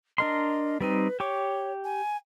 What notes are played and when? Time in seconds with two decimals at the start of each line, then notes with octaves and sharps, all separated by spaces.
0.18 D4 A#4 D#5 C6
0.81 G3 C4 D#4 B4
1.20 G4 C#5 C#6 D6
1.84 G#5